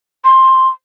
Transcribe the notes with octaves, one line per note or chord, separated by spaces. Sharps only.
C6